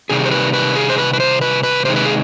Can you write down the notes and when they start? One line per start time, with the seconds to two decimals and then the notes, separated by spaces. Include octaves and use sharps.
0.09 C3 D#3 G3 G#4
0.26 C5
0.31 B4
0.53 B4
0.76 G#4
0.90 C5
0.98 B4
1.13 B4
1.20 C5
1.41 B4
1.63 B4
1.85 C3 D#3 G#3 C5
1.96 B4
2.05 G#4